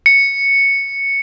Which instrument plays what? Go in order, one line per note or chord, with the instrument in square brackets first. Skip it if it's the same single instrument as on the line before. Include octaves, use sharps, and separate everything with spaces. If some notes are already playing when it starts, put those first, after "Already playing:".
[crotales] C#7